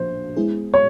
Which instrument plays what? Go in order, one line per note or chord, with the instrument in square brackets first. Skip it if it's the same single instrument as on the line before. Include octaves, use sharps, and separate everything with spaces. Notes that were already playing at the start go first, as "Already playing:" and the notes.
Already playing: [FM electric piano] A#2 F3 A#3 D4 [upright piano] C5
[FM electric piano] G#3 B3 E4 G#4
[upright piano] C#5